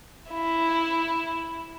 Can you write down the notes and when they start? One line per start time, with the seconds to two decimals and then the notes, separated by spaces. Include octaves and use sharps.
0.31 E4